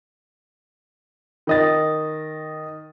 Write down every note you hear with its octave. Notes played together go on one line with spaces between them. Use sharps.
D#3 D#5 A6